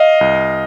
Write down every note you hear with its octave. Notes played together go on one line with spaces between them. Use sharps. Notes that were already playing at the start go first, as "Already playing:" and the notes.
Already playing: D#5 F5
C2